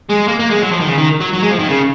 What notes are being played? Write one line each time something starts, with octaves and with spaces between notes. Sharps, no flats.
G#3
A#3
A#3
G#3
F#3
F3
D#3
C#3
D#3
F#3
F#3
G#3
F3
D#3
C#3